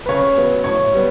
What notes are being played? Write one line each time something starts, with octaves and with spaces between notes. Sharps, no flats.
B4
C#3 C#5
F#3 B3
A2 C#5
G3 B3